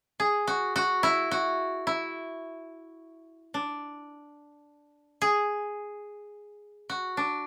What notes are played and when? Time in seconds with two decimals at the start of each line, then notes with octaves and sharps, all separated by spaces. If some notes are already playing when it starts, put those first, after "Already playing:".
0.20 G#4
0.47 F#4
0.76 F#4
1.03 E4
1.31 F#4
1.87 E4
3.54 D4
5.22 G#4
6.89 F#4
7.17 D4